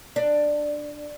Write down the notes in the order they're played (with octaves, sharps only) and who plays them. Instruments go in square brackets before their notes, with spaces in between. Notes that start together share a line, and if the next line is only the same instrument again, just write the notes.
[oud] D4